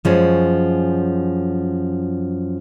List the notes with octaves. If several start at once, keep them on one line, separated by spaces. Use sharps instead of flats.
F#2 F3 G#3 C#4